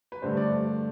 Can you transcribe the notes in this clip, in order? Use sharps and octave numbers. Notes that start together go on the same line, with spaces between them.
B4
G2 D3 A3 C5
D5